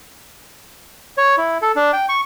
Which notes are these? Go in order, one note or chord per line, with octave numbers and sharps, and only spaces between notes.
C#5
E4
A4
D4
G5
C#6